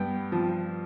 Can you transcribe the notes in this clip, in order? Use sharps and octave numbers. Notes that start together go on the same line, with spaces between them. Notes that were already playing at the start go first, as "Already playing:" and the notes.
Already playing: G2 B3 G5
F3